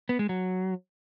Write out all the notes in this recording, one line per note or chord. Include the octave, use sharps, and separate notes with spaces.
B3
G#3
F#3